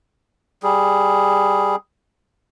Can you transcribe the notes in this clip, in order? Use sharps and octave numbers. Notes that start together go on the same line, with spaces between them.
G3 G#4